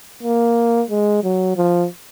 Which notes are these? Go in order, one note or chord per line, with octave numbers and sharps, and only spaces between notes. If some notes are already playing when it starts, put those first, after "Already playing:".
A#3
G#3
F#3
F3